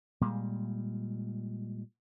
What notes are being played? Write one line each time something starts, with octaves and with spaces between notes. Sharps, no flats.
A#2 G3 G#3